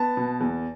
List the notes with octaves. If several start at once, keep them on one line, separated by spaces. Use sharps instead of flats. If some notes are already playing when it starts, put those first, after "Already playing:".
Already playing: B3 A5
B2
E2